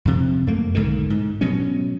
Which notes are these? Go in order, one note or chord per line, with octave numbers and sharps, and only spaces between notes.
F2 C3
F#2 A3 A#3
B1 G#2 D3 D#3
G#2
B2 F#3 C#4